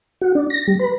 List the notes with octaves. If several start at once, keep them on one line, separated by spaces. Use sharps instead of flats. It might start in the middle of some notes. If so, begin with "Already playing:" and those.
F#4
D4
A#6
G3
B4